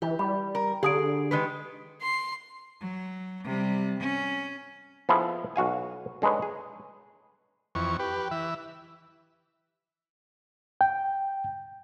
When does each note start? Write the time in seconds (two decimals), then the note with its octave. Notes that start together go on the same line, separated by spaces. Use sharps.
0.02 E3 G4
0.19 G3 B5
0.55 A#4
0.83 D3 G4 G#4 D#6 D7
1.31 D#3 G#3 B4
2.02 C6
2.81 F#3
3.45 C3 G3
4.00 C#4
5.09 F3 B3 E4 G#4 A4
5.56 B1 F#4 F5 G#5
6.22 D3 G#3 D#4 B4 C#5
6.42 G#4
7.75 F2 E3 C#6
7.99 G4 B4
8.31 E3 E5
10.81 G5